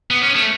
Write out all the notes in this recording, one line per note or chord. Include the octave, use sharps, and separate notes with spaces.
B3
C#4
A3